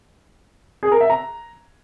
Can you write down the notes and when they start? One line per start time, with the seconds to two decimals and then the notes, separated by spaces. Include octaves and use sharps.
0.83 G#4
0.92 A#4
1.01 E5
1.10 A#5